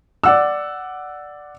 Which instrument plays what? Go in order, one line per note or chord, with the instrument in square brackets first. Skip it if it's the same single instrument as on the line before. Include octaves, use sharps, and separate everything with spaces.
[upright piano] D5 F#5 E6